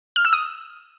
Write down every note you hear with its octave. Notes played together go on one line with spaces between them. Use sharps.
F6
E6
D#6